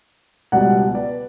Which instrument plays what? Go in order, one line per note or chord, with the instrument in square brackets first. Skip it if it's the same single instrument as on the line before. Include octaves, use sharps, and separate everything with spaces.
[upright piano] C#2 B2 G3 D5 F#5
B4 D5